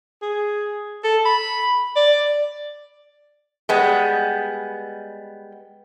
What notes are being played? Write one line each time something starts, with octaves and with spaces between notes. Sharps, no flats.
G#4
A4
B5
D5
G3 G#3 B3